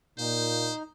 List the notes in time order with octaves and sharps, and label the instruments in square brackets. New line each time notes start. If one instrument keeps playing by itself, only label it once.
[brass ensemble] A#2 [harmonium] D#4 [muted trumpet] C5